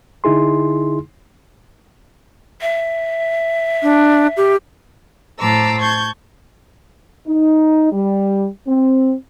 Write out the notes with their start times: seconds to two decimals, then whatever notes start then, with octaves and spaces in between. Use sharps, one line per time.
0.24 D3 D#4 E4 G#4 C6
2.61 E5
3.82 D4
4.37 G4
5.39 A2 C5 A5 A#5 D6 E6
5.80 A5 C#6 G6 G#6
7.27 D#4
7.92 G3
8.67 C4